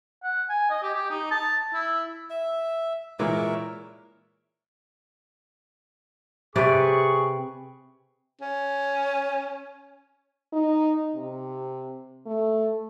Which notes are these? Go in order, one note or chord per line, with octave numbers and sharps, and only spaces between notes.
F#5
G#5
D#5
G4
G4
D#4
A5
E4
E5
A#2 E3 G#3 A#4 C#5 E5
C3 G#4 B4 D5 C#6
C#4
D#4
C3
A3